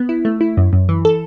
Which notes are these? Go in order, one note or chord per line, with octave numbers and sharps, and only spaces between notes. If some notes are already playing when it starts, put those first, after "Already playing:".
Already playing: B3
E4
A3
E4
F#2
F#2
E3
A4